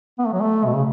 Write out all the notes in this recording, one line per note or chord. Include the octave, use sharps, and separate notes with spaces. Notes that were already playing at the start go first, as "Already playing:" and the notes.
B3
A3
F#3
A3
B2
C#3